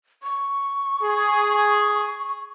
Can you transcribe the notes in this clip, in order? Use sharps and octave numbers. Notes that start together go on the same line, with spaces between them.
C#6
G#4